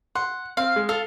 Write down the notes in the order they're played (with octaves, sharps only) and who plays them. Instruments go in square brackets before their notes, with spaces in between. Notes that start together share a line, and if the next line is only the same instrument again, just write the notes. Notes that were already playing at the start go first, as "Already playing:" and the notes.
[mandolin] F#5 [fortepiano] C6
[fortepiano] C4 [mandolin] F5
[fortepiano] G#3
[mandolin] F4 [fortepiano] A4